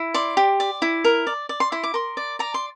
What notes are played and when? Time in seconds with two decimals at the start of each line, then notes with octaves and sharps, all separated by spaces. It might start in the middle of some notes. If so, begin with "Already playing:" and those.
Already playing: E4
0.14 D5 C6
0.37 G4
0.60 D5
0.82 E4
1.04 A#4
1.27 D5
1.49 D5
1.60 C6
1.72 E4 C6
1.84 D6
1.94 A#4 C6
2.17 D5
2.39 D5 A#5
2.54 C6